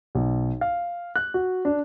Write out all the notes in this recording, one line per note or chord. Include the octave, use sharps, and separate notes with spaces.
B1
F5
F#6
F#4
D4